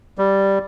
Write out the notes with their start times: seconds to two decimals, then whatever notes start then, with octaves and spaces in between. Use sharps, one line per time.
0.18 G3